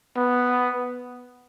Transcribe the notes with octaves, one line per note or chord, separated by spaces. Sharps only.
B3